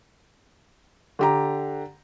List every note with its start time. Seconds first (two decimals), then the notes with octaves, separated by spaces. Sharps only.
1.19 D3 G4 A#5